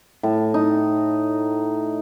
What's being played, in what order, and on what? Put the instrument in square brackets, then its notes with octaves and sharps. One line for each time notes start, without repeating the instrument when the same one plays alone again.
[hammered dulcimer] A2
D#4